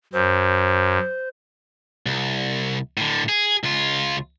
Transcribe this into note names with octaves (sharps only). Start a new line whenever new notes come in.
F#2 C5
C2
A2 D3
G#4
C#2 F4